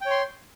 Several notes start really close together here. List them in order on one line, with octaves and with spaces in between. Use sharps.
G5 C#5 C6